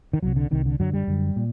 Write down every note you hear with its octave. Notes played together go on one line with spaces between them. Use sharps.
D#3
C2 C3 F#3
D3
C2 C3 D#3
D3
F#2 D3 F#3
G3
F#2 D3
A#2